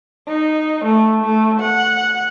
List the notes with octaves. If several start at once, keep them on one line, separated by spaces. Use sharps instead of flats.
D#4
A3
A3
F#5